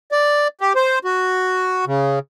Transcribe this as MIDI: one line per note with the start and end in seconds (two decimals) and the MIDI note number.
0.12 0.48 74
0.61 0.73 67
0.75 0.99 72
1.04 1.85 66
1.87 2.19 49